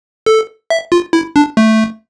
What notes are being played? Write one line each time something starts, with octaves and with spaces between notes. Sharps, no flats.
A4
E5
F4
E4
D4
A3